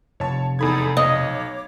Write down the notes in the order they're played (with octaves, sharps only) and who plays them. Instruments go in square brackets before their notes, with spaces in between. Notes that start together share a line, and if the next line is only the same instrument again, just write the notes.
[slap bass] F1 [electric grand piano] C#5 A5
[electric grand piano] E2 B5 G#6 [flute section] D#4 A4 D#6
[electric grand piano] B1 [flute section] C#5 D6 [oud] D#5